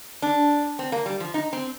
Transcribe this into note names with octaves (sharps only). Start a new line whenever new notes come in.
D4
C4
A#3
G3
F3
D#4
C4